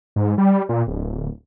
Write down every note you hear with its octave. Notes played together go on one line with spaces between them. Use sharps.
G#2
G3
A#2
D1